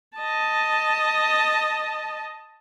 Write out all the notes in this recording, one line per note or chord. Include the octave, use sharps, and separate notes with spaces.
D#5 A5